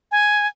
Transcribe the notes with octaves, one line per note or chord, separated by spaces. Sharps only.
G#5